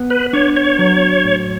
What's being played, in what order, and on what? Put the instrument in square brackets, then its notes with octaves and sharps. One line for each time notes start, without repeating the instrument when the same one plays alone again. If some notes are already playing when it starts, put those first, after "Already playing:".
Already playing: [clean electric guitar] B3
[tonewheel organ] B4
[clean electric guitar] D4 [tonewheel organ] C#5
[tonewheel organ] C#5
[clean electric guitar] F#3
A2